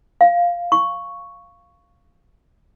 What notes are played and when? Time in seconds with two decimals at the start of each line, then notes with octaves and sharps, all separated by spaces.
0.21 F5
0.72 C#6